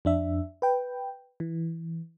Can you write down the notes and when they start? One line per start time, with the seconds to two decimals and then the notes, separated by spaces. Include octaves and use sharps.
0.05 F2 D4 E5
0.62 B4 G5
1.40 E3